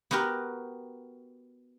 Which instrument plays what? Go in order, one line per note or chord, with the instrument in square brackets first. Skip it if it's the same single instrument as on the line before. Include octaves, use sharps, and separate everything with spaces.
[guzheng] B3 F#4 G4 A#4 B4